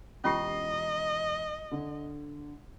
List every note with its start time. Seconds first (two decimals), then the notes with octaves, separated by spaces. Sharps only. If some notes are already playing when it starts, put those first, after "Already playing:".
0.24 E1 C#4 F4 G4 D#5 A#5 C7
1.72 D3